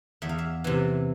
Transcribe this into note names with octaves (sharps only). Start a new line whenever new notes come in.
E2 E5
F5
E5
C3 E3